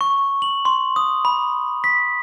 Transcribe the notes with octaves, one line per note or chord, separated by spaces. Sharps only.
C#6
F#7
C6
D#6
B5
B6